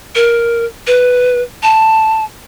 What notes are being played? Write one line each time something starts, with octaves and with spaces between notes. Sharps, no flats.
A#4
B4
A5